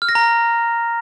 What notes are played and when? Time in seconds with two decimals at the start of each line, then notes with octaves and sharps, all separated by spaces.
0.02 F6
0.09 A#6
0.15 A#5